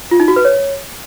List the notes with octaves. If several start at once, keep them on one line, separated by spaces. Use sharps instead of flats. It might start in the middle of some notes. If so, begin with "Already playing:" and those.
F4
D#4
F#4
B4
C#5